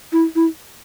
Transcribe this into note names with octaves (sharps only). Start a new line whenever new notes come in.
E4
E4